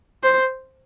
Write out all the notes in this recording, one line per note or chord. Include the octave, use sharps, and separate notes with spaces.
C5